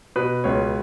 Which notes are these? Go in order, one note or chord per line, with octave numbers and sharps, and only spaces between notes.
B2 B4
C#2 C#5